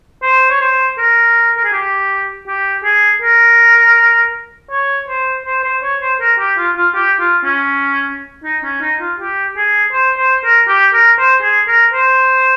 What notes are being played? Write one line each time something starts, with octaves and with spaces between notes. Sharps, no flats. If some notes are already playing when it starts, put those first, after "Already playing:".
C5
C#5
C5
A#4
A#4
G#4
G4
G4
G#4
A#4
C#5
C5
C5
C5
C#5
C5
A#4
G4
F4
F4
G4
F4
C#4
D#4
C#4
D#4
F4
G4
G#4
C5
C5
A#4
G4
A#4
C5
G#4
A#4
C5